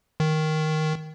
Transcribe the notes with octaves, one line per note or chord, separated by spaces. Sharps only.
D#3